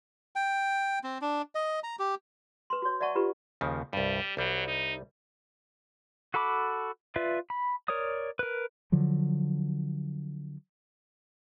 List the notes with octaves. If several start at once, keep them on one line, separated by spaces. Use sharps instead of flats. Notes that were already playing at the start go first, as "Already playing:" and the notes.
G5
C4
D4
D#5
A#5
G4
B4 C6
F#4 C#5
D5 E5 F#5 A5 C#6
F4 G4 B4
D#2 C#3 F3
C2 G2 G3
C2 F#3 G3
D#4
F#4 A4 A5 B5 D6
F4 B4 D5 E5
B5
A#4 C#5 D5 D#6
A#4 B4
D3 F3 F#3